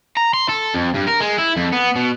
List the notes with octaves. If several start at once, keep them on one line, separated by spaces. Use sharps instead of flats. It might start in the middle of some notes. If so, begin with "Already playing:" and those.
A#5
C6
A4
F2
G2
A#4
G#3
E4
F2
B3
B2